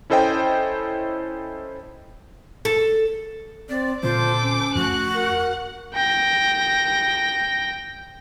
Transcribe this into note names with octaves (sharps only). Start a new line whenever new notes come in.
C#4 E4 A4 C5 D#5 G5
A4
C4 D5
A#2 D3 C4 F4 A4 C5 D6
C#4
F2 F3 A3 F#4 F#6
A#4 F#5
G5 A#6